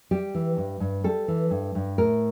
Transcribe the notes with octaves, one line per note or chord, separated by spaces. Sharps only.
G3 G4
E3
G2
G2
G3 A4
E3
G2
G2
A2 A#4